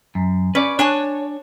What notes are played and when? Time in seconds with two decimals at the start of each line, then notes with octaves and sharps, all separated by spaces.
0.15 F#2
0.55 C#4 B4 D5
0.79 D4 C#5 G#5 A5